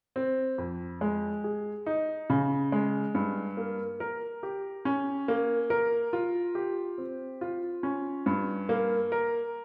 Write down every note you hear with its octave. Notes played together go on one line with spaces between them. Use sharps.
C4
F2
G#3
G#4
D#4
C#3
G#3
G2
A#3
A#4
G4
C#4
A#3
A#4
F4
G4
C4
F4
C#4
G2
A#3
A#4